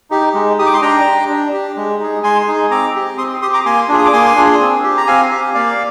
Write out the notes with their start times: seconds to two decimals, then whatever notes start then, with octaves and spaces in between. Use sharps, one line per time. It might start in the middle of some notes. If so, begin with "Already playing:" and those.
0.11 D#4 G4
0.34 G#3
0.59 D#4 G4 D#6
0.66 D6
0.73 C6
0.81 D4 G5 A#5
1.06 G4
1.29 D4
1.53 G4
1.77 G#3
2.00 D#4 G#4
2.23 G#3 G#5 C6
2.47 D#4 G#4
2.70 C4 A#5 D6
2.95 G4
3.18 C4 C6 D#6
3.42 G4 C6 D#6
3.53 A#5 D6
3.65 A#3 G#5 C6
3.89 D4 F4 G#4
3.99 D#6
4.05 D6
4.13 A#3 G#5 C6
4.36 D4 F4 G#4
4.60 C4
4.83 G4
4.97 A#5
5.07 C4 F5 G#5
5.31 G4
5.55 A#3 D5 F5